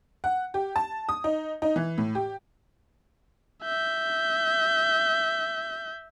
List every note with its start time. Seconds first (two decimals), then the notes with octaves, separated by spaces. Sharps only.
0.24 F#5
0.54 G4
0.76 A5
1.09 D#6
1.24 D#4
1.62 D#4
1.76 E3
1.98 A2
2.15 G4
3.63 E5 G6